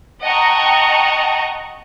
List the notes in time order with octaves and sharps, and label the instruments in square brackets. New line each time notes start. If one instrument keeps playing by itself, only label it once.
[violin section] D#5 F#5 G5 A5 A#5 C#6